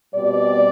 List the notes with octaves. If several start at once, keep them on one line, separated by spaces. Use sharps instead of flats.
B2 G3 C4 D5